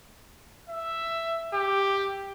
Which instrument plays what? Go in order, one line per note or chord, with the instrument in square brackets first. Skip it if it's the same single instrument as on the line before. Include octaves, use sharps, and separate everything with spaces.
[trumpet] E5
G4